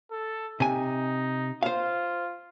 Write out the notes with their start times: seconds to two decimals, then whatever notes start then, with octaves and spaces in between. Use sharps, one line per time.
0.11 A4
0.60 C3 D#4 G#5
1.63 F4 C5 F5